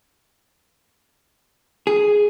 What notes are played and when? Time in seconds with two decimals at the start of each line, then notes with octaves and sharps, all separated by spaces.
1.87 G#4